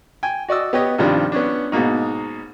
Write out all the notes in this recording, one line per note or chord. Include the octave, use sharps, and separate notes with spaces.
G5 G#5
F#4 D5 D#5 E6
B3 G4 C#5 D#5
G2 C3 D#3 F3 G3 D4
B3 C#4 D4
G#2 B2 A#3 D#4